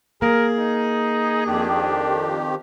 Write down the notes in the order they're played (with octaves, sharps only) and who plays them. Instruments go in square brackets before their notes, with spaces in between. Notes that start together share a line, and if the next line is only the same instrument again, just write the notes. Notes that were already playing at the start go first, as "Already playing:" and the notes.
[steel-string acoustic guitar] A#3 [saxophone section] G#4 [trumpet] A#4
[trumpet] D#4
[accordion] F2 D#3 G4 [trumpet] D4